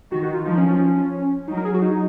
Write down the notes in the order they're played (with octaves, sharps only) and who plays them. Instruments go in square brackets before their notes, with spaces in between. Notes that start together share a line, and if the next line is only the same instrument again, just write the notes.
[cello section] D#3 [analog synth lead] F#4
[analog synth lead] F#4
F4
[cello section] F3 [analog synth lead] D#4
[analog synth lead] C#4
C#4
[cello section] F#3 [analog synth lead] D#4
[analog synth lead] A#4
G#4
F#4
D#4